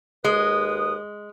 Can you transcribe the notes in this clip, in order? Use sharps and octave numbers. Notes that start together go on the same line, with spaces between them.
D#2 G#3 B4 D#6